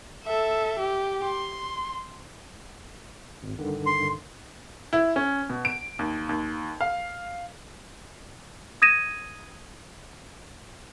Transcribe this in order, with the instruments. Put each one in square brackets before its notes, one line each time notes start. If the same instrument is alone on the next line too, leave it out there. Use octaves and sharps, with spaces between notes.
[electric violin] A4 E5
G4
C6
[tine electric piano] G#1
G2 D3 D#3
[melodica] C6
[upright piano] E4
C#4
B2
D7
D#2
D#2
F5
[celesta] D#6 G#6 A#6 D#7 E7